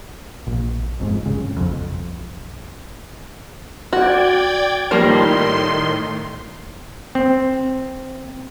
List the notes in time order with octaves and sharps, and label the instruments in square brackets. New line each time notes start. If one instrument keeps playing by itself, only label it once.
[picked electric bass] A#1
F1 F2 G#2
G1 C#3
B1 F2
[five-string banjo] F#4 [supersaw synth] D5 G5 G#6
[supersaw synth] A2 D#3 C6 [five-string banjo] F3 G3 A#3
[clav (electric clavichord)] C4